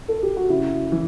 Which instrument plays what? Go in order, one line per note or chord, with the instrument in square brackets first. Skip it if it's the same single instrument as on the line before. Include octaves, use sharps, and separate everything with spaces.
[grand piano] A4
G4
F#4
[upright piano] C#3 [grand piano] E4
[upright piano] E3